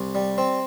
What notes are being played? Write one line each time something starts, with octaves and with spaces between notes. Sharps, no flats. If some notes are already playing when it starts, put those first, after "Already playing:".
Already playing: C2
G3
C4